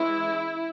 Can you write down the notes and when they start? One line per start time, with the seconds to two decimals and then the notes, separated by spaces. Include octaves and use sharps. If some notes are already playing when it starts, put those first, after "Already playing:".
Already playing: E3 G#3 C#4 E4